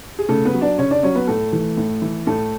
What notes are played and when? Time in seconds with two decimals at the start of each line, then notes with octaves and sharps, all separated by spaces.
0.19 G#4
0.29 C#3 A3 A4
0.45 B3 B4
0.53 F#3
0.61 D4 D5
0.78 C#3 C#4 C#5
0.91 D4 D5
1.03 F#3 C#4 C#5
1.15 B3 B4
1.27 A2 A3 A4
1.53 E3
1.77 A2
2.02 E3
2.27 A2 A3 A4